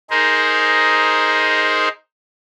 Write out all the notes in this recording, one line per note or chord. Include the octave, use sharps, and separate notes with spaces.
D#4 G#4 A#4 C5